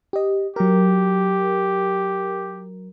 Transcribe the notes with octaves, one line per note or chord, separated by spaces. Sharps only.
G4 D#5
F#3 G4 A#4